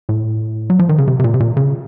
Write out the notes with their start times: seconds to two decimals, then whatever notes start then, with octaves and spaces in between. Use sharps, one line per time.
0.09 A2
0.70 F#3
0.79 F3
0.89 D#3
0.98 C#3
1.08 C3
1.19 C3
1.24 A#2
1.34 C3
1.40 A#2
1.57 C#3